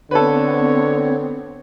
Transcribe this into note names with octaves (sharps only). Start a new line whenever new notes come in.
D3 B3 C4 A4 B4 C#5